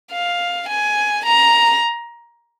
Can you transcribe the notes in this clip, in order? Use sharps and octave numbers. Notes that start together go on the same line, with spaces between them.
F5
G#5
A#5